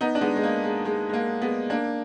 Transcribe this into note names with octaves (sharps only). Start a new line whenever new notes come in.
B3 D#4
D4
G#3 B3
G#3
A#3
G#3
G#3
G#3
A#3
G#3 B3
A#3 D4